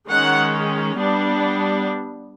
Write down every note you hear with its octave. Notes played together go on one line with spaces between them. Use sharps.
D#3 G#3 C#4 F#5
G3 B3 D4